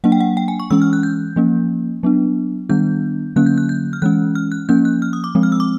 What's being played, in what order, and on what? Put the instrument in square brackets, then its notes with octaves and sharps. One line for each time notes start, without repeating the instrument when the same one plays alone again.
[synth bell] F#3 A#3 D4 F#5
G5
F#5
G5
G#5
C#6
E3 G#3 C#4 E6
F6
F#6
G6
F3 A#3 C#4
F#3 B3 D4
D#3 G3 B3 D4 G6
D3 F#3 A#3 C#4 F#6
G6
F#6
G6
F6
E3 G#3 C#4 F#6
F6
F#6
F3 A#3 C#4 G6
F#6
F6
D#6
D6
F3 G#3 C4
F6
E6
D6